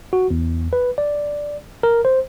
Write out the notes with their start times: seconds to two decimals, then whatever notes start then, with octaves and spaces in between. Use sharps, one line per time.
0.13 F#4
0.31 E2
0.73 B4
0.98 D5
1.83 A#4
2.05 C5